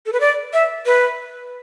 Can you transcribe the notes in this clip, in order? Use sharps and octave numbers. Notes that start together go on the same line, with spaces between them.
A4
B4
D5
E5
B4